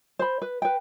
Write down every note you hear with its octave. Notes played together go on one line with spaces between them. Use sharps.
C5 B5
B4
B4 G5